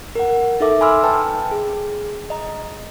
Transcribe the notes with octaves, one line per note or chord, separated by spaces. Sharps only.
A#4 F#5
D#4 A4 E5 D6
G#5 B5 C6 D6 E6 F6
B4 G5 A5
G#4
D#5 A#5